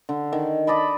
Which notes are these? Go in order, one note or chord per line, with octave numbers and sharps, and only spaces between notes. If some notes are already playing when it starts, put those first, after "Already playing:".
D3
D#3
D5 D#5 A5 B5